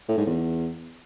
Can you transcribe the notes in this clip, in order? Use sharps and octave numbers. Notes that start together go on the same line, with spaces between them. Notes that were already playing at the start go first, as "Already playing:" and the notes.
A2
G#2
E2